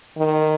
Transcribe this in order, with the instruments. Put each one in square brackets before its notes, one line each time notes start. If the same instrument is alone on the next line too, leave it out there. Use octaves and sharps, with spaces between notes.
[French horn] D#3